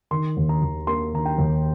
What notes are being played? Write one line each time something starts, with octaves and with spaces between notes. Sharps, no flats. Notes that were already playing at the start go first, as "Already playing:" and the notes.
D#3 C6
D#2
A#5
D#2
A#3 C6
D#3 A#5
G5
D#2